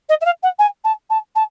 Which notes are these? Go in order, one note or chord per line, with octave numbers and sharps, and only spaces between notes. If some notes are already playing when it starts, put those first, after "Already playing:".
D#5
E5
F5
F#5
G#5
A5
A5
A5